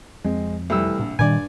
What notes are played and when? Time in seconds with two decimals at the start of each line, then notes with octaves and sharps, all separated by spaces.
0.24 F2 G#3 C4
0.70 C2 E3 G3 A3 E6
0.99 A#1
1.19 G2 A#2 D#3 G3 D5 G#5